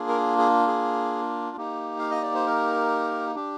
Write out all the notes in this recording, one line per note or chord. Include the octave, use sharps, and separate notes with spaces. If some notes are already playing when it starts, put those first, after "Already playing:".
Already playing: A#3 D4 F4 G#4
A#4
G#4
G#4
A#3 D#4 G4
F5
D#5
D5
C5
A#4
D4 G4